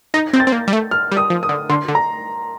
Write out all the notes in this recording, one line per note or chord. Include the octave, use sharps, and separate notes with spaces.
D#4 A#6
C4 G6
A6
C4
A#3
G3
A3
F6
G3
D#6
F3
D#6
D3
D3 C6
D3
A#5